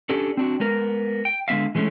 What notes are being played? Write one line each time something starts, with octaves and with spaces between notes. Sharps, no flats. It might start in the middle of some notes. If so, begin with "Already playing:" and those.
C#4 D4 G4 A4
C4 D4 F#4
G#3 B3 A#4
G5
D3 G#3 B3 E5 F5
E3 G#3 A3 C4 C#4